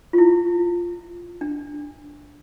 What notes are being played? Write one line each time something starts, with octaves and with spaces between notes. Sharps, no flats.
F4
E4
D4